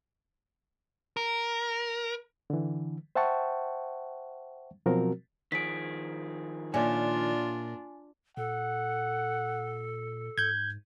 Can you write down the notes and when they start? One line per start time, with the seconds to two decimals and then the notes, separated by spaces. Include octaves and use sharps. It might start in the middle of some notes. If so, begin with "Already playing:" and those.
1.17 A#4
2.50 D3 E3
3.15 C5 E5 F#5 G5 A5 C#6
4.86 B2 F3 F#3 C4 F#4 A#4
5.52 D#3 F3 G#4 B6 D7
6.74 A#2 D4 F4 C#5 E5 G#5
8.37 A#2 A4 F#5
10.38 G#2 G6 G#6